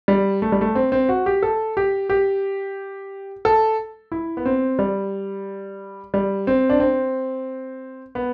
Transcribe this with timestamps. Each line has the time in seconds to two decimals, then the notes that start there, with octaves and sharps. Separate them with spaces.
0.08 G3
0.42 A3
0.52 G3
0.61 A3
0.75 C4
0.92 C4
1.09 F#4
1.26 G4
1.43 A4
1.77 G4
2.09 G4
3.45 A4
4.12 E4
4.37 B3
4.46 C4
4.79 G3
6.14 G3
6.47 C4
6.70 D4
6.80 C4
8.15 B3